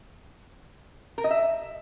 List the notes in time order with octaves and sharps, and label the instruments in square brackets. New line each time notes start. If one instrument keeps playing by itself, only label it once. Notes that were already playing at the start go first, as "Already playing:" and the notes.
[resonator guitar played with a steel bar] A#4
D#5
E5